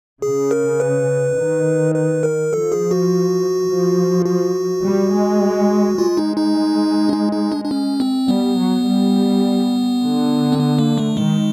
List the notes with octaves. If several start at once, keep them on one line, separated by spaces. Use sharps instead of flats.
C#3 G#4
A#4
B4
D#3
B4
A#4
F3 A4
G#4
F#4
F3
F#4
G3
G#3
G#3 F4
D#4
D#4
D4
D#4
D#4
D4
D4
C#4
C4
G3 B3
F#3
G3
D3
C4
B3
A#3
A3
D#3 G#3